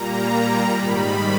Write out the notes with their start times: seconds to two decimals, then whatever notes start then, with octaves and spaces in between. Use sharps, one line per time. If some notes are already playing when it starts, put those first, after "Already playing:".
Already playing: A#2 G3 A#3 A#5
0.68 G#2 D#3 G3 B5